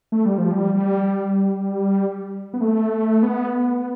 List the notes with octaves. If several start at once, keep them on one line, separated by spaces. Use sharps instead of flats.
A3
G3
F3
G3
G3
B3
A3
B3